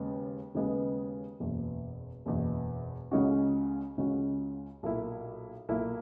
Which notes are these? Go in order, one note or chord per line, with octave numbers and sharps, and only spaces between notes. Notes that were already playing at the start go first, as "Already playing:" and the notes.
Already playing: D#2 C#3 G#3 B3
D#2 C#3 G#3 B3
F#1 E2 B2
F#1 E2 B2
C#2 C#3 G#3 C#4 F#4
C#2 C#3 G#3 C#4 F#4
B1 A#2 A#3 E4
B1 A#2 A#3 E4